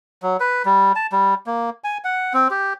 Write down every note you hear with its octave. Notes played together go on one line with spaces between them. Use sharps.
F#3
B4
G3
A5
G3
A#3
G#5
F#5
C4
G4